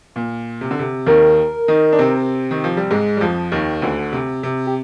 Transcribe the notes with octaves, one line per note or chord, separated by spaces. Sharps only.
A#2
C3
D3
C3
D#2 D#3 A#4
D#3 D#4
D4
C3 C4
D#3
F3
G3
G#2 G#3
G3
F2 F3
D#2 D#3
D2 D3
C3
C3
G4